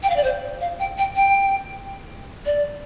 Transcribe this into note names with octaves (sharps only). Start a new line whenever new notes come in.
G5
F5
D5
C5
F5
G5
G5
G5
D5